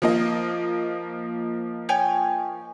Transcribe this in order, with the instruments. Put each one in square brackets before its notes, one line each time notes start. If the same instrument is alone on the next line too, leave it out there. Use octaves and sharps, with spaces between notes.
[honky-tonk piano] F3 A#3 D#5
[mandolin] C#5 G5 G#5